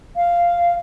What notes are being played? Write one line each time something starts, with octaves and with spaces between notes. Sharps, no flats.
F5